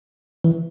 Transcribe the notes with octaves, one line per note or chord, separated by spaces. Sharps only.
E3